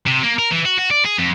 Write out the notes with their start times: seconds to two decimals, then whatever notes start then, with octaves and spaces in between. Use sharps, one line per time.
0.06 C3
0.23 A#3
0.39 A#4
0.51 E3
0.66 F#4
0.79 F#4
0.91 D5
1.05 G#4
1.19 F2